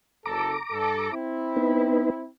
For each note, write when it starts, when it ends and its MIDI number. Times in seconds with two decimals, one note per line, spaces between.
0.26 0.55 30
0.26 0.55 69
0.26 1.15 82
0.26 1.15 86
0.71 1.08 43
0.71 1.08 69
1.12 2.28 60
1.12 2.28 64
1.56 2.10 59
1.56 2.10 63
1.56 2.10 71